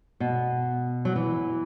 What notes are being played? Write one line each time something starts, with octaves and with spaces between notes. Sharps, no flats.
B2
F#3
E3